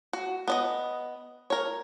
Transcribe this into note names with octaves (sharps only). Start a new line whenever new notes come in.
F#4
B3 D5 D#5
A#4 C#5